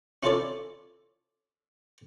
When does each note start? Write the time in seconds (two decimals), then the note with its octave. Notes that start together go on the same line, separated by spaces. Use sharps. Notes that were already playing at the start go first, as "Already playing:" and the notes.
0.23 C#4 E4 F4 A4 C#5 D5